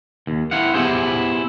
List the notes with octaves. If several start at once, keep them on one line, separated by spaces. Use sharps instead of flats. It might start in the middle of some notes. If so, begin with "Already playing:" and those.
D#2
C4 E4 F5 F#5
B3 E4 G4 G#4 C5 E5